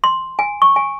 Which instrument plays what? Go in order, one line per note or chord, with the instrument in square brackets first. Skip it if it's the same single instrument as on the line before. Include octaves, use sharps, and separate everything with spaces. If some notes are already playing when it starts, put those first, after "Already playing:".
[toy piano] C6
G#5
C#6
G#5